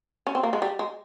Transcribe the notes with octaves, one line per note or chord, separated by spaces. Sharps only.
C#4
C4
A#3
G#3
G3
G#3